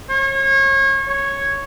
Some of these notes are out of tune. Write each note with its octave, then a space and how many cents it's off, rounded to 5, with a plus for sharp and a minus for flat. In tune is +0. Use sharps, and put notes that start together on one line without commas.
C#5 -35
C#5 -5